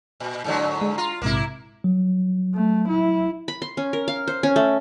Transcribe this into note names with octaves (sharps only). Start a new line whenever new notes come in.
A#2
G#2 D3 F#3
G#3
F4 A#5 C6
A#1 G#2 C3 A#3 E4
F#3
A3
E4
B5
C6
C#4
A#4
F5
C5
C#4
A3